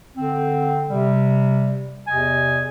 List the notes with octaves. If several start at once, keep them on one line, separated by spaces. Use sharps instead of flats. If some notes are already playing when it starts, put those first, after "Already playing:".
D3 C4
C3 G3
E2 C3 D#5 G#5